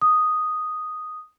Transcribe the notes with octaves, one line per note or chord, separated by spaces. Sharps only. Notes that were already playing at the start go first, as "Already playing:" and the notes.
D#6